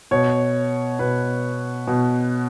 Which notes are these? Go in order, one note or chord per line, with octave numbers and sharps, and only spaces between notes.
B2 C#5
B2 B4
B2